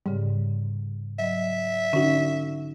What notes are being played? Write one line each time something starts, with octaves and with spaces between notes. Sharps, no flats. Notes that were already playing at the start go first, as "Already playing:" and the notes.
G#2 C#3 G3
F#3 D#5 E5
D3 C#4 D#4 F#4